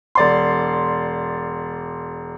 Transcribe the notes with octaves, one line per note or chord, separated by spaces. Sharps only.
E1 D5 C6